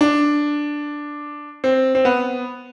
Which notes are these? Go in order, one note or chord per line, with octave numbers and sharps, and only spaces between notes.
D4
C4
C4
B3